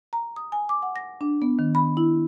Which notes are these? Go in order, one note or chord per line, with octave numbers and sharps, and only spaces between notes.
A#5
D#6
G#5
D6
F#5
A#6
D4
B3
D#3
B5
E4